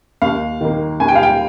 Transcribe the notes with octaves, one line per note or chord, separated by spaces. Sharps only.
D#2 F5
D#3 A#3
D#2 G#5
G5
F5
G5